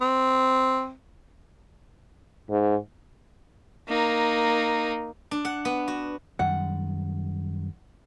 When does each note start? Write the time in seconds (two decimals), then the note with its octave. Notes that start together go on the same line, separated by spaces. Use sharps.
0.01 C4
2.50 G#2
3.88 A#3 D#4
5.31 D4
5.45 F#5
5.65 B3
5.88 F#4
6.39 F#2 D#3 G3 F#5